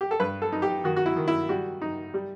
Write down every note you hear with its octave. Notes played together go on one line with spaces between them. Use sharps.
G4
A4
G2 B4
A4
D#4
G4
D#3 F#4
F#4
E4
D#3
E4
G3 F#4
D#4
G3